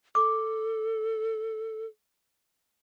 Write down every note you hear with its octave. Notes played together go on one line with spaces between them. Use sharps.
A4 D6